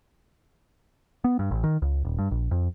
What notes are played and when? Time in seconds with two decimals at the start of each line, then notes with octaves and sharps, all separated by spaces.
1.24 B3
1.39 G2
1.51 A1
1.64 D#3
1.82 C#2
2.05 D#1
2.19 G2
2.31 A#1
2.51 F2